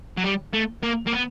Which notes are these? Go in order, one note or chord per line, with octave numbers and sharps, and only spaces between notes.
F#3
G3
A3
A#3
A#3
B3